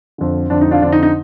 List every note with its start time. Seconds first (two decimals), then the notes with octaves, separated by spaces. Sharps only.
0.18 F2 D3
0.50 F2 D3 D4
0.61 D#4
0.71 D4 F4
0.82 F2 D3 D4
0.92 D#4
1.03 D#4